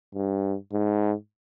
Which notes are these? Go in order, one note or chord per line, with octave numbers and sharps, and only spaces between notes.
G2
G#2